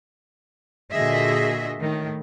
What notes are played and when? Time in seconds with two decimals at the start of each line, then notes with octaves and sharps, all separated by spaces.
0.92 A#2 D3 F#4 G#4 D#5 E5
1.79 A2 D#3